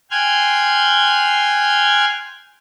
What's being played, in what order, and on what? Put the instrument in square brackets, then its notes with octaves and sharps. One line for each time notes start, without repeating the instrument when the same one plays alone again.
[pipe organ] G5 G#5 C6 F6 F#6 G#6